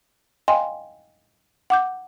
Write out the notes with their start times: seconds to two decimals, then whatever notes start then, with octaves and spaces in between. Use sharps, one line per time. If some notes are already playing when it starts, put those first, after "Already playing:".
0.48 D#5 F5 G5 G#5 C6
1.70 F#5 D6 G6